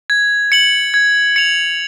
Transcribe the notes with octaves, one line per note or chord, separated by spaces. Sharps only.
G#6
C#7 F#7
G#6
C#7 F7